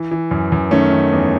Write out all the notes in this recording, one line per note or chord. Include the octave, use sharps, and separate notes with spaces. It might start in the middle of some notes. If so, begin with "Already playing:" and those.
Already playing: E3
E3
F#2
F#2
D#3 A3 C#4
D#3
E2